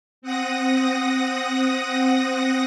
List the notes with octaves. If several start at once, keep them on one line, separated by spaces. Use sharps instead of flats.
C4 F#5 D#6 A#6